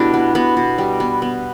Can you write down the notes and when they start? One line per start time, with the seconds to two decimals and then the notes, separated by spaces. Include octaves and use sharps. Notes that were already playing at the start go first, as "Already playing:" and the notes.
Already playing: B2 A3 D4 E4 G4
0.14 B3
0.35 B2 B3
0.57 B2
0.78 G3
1.00 B3
1.22 B3